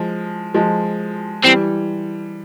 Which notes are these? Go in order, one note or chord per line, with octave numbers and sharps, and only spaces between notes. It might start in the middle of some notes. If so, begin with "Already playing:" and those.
Already playing: F3 G#3
F3 G#3
E3 G3 C4